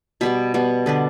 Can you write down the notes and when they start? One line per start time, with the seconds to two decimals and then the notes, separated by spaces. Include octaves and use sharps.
0.21 B2 G3 B3 B5
0.54 B2 G3 B3
0.86 D3 B3 D4 B4